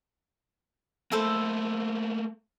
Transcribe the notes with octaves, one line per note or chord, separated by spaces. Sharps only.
A3 A#3 E4 A4 C5